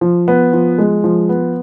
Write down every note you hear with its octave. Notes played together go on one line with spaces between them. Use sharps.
F3
B3
F3
G#3
F3
B3